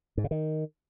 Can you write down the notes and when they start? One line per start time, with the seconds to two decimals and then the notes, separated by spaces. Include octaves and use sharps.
0.17 G#2
0.24 C#3
0.31 D#3